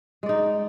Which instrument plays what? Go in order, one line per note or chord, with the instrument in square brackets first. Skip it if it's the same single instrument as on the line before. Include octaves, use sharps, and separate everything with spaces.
[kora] G#3
D5
D#4